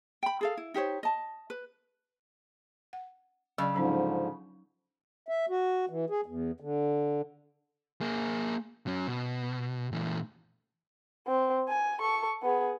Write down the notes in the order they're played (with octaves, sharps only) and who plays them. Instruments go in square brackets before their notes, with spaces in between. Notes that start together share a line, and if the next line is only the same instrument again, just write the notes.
[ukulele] G5 B5
G#4 A4 F5
E4
D#4 G4 C5 C#5
D#5 A5
B4
[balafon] F#5
[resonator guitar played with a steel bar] C#3 [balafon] F#3 D5
[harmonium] G#2 D3 F3 [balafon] F#3 C#4 D#4
[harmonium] E5
F#4
E3
G#4
E2
D3
[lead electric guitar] A#3 G#4
F#3 C#4
B2
A#2 E3
[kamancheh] C4
G#5
A4 C#6
B3 G#4